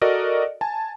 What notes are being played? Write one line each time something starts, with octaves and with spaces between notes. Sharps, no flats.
F#4 A4 A#4 D5 D#5
G#5 A5